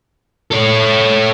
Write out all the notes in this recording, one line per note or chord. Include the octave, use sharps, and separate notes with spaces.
A4 C#5